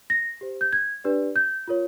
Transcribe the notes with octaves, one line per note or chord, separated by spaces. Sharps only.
A#6
G4 C5
G6
G#6
D4 G4 B4 D5
G6
F4 A#4 C#5